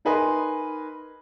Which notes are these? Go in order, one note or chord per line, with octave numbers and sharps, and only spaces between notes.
D#4 A#4 B4 D#5 G#5 C6